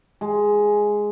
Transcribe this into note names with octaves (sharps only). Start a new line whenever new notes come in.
G#3